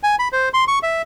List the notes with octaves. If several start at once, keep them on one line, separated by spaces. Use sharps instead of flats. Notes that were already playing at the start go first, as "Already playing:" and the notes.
G#5
B5
C5
C6
C#6
E5